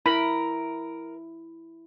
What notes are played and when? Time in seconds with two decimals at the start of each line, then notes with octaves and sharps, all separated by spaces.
0.06 E4 A#4 B5